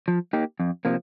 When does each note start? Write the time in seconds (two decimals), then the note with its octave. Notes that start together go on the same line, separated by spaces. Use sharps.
0.08 F3
0.33 A#3 D#4 G4
0.60 F2
0.85 C3 F3 A#3